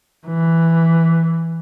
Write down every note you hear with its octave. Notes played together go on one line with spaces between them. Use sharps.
E3